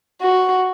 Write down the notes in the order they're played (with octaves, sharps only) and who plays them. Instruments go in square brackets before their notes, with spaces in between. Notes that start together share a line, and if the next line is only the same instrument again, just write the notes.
[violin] F#4